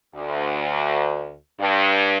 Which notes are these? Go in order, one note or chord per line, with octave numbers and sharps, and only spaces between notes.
D2
G2